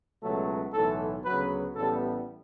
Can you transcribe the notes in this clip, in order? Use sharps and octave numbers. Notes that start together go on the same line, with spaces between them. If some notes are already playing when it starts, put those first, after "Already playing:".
C#2 B2 F#3 A3 A4
B1 A2 E3 A3 A4
D2 C#3 F#3 B3 B4
A1 A2 G3 B3 A4